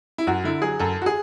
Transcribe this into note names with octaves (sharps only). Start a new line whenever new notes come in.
E4
F#2 F#4
D3 E4
F#3 G#4
F#2 A4
F#4
G#4